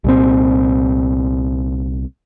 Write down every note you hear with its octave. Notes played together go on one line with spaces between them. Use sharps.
C2 A#2 C4